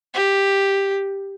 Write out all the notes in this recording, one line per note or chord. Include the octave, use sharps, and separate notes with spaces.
G4